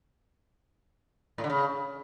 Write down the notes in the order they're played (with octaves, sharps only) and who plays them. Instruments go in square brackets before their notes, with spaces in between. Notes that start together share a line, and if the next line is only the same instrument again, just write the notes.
[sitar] A2
D3
C#3